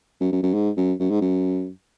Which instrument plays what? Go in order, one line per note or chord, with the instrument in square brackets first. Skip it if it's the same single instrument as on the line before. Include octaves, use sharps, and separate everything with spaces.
[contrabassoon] F#2
F#2
F#2
G#2
F#2
F#2
G#2
F#2